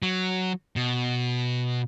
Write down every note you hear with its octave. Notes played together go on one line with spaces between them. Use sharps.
F#3
B2